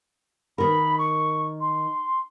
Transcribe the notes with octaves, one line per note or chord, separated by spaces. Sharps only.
D#3 A#4 B5
C#6
C6